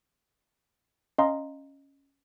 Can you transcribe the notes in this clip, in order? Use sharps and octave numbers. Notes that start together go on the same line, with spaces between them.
C#4 D#5 F5 A#5 C6